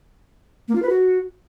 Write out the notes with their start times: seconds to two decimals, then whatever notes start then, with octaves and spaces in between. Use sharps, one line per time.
0.68 A#3
0.75 F4
0.82 B4
0.89 F#4